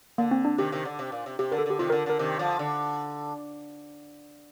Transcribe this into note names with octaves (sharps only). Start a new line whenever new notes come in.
D3 A#3
C4
D4
C3 D#3 G4
C3 D#3
D3
C3
A#2
C3
C3 G4
D3 A#4
A4
D3 G4
C3 D#3 F4
D3 A#4
D3 A#4
C3 D#3
D3 F3
D3